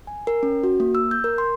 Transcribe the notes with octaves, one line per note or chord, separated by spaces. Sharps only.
G#5
A#4
C#4
F#4
A#3
E6
G6
A#4
C6